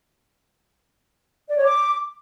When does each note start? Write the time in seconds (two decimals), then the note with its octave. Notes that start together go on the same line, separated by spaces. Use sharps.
1.49 D5
1.57 C#5
1.65 D6